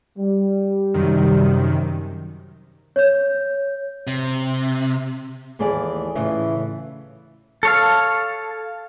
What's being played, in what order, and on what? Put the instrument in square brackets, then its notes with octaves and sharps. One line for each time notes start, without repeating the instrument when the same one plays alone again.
[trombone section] G3
[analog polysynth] F#2 C3 D#3
[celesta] C#5 G6
[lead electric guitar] C3
[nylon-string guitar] D#2 E3 F4 G#4 A4 D5
A2 C#3 E3 F4 E5
[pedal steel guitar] A4 C#5 F5